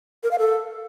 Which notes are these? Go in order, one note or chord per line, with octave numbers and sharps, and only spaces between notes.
A#4
F5
A4